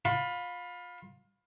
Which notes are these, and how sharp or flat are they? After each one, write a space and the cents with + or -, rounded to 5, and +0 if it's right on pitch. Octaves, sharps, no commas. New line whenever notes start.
F4 +25 B5 +0